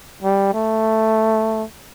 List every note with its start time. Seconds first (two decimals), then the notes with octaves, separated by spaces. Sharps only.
0.22 G3
0.54 A3